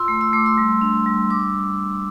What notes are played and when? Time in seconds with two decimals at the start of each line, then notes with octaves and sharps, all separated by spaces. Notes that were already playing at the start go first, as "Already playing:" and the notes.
Already playing: F4 C6 E6
0.08 A3
0.21 E6
0.33 A3 D6
0.46 C6 E6
0.58 G3
0.81 D4
1.06 G3
1.30 G3 D6
1.40 E6